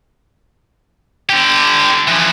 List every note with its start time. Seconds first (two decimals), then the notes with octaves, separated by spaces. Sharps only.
1.30 D3 G4
2.08 E3 F3